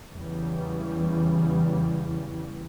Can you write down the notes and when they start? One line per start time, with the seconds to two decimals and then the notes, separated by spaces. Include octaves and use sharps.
0.11 E2 C#3 E3 G3